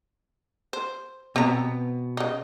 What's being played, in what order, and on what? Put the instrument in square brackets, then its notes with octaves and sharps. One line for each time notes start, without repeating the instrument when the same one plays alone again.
[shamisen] C5
[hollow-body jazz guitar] B2 B3 [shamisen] C4 A#5
[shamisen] C#3 D#4